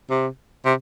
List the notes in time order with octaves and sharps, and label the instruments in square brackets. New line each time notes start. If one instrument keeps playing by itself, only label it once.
[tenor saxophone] C3
C3